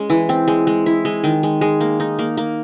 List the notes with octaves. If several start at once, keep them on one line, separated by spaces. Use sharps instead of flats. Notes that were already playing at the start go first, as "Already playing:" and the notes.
Already playing: G#3 C#4
E3
C4
G#3
G#3
E4
G#3
D#3
G#3
G#3
A#3
D#4
A#3
A#3